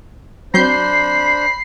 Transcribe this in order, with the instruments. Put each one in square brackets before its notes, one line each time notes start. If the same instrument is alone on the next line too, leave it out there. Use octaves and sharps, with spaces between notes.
[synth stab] F#3 C4 G6 [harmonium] D4 C5 [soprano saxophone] B5 [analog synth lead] C7